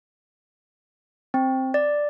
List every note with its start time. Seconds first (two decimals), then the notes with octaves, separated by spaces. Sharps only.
1.34 C4
1.74 D5